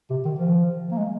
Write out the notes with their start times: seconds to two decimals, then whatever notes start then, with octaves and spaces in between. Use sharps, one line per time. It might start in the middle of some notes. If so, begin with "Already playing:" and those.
0.10 C3
0.25 D#3
0.39 F3
0.91 A#3
0.98 G#3